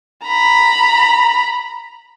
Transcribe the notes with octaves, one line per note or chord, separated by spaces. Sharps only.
A#5 B5